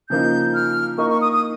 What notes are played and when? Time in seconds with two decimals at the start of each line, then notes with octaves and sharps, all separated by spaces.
0.09 C#3 F3 A#3 D#4 G6
0.54 F6
0.98 A#3 D#4 A#4 D#5 C#6
1.09 C#6
1.21 D#6
1.32 D#6